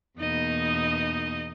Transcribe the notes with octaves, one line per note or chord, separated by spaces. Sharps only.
E2 B2 A#3 D#4 D#5